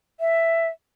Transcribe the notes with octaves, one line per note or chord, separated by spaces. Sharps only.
E5